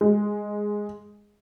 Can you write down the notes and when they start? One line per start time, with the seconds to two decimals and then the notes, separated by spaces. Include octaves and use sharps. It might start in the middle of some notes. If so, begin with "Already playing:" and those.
0.01 G#3